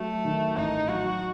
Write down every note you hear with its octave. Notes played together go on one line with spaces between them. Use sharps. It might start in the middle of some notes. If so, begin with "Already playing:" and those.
Already playing: F#3 A3
D#3
A1 D#4
F#3 F#4